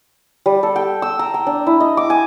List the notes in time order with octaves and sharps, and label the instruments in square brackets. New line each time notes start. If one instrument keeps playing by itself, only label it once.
[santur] G3
A4
G5
E6
A#5
G5
D4
E4
D#5
D6
G#5